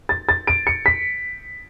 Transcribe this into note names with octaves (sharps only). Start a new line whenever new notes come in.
A6
A6
D7
C#7
B6